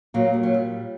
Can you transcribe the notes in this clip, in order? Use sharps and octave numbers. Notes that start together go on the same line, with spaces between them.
A#2 F#3 A#3
G3
F#3
G3